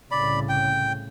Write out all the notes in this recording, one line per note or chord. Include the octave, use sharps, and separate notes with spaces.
C2 A2 C#3 D5 B5
G5